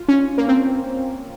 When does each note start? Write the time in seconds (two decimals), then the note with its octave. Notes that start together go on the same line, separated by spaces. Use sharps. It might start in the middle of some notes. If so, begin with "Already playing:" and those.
Already playing: F4
0.08 C#4
0.38 A#3
0.48 C4